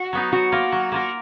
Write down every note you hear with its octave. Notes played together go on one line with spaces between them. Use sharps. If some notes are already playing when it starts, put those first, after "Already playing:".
Already playing: F#4
F#3 B3 D#4
F#3 F#4
A#3 F4 A#4
F#3
A#3 F4 A#4